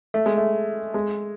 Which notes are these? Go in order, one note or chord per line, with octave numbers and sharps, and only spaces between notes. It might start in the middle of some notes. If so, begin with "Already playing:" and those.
A3
G#3
A3
G#3